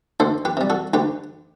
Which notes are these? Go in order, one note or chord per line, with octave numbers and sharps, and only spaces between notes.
D2 A4 C5
G4 B4
C3 G3
F#4 A4
D2 G4 B4